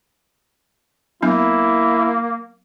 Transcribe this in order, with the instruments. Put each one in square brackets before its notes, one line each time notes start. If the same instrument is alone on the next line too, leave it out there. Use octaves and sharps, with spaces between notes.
[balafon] F#3 B3 D4 [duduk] A#3 [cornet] E4